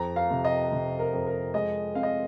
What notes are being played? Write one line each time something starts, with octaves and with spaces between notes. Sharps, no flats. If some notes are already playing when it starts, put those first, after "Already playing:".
Already playing: F2 A#5
F5
C3
D#5
C3
A#4
F2
A#4
G#3 D#5
C4 F5
D#5